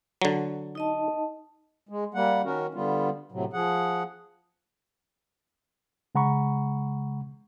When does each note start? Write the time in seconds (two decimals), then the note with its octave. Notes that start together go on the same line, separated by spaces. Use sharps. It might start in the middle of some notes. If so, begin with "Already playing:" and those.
0.22 D3 F#3
0.75 D#4 D#5 A5
1.89 G#3
2.14 G3 A#3 F#5
2.45 D#3 C#4 F#4 A#4
2.74 D3 G3 B3 F4
3.32 A2 C3 F#3
3.53 F3 G#4 F#5
6.15 C#3 G#3 F#5 A#5 B5 C#6